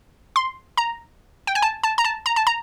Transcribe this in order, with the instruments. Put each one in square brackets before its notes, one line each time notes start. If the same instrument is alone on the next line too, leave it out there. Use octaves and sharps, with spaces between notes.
[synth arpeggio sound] C6
A#5
G5
G#5
A5
A5
A#5
A5
A#5
A5
A#5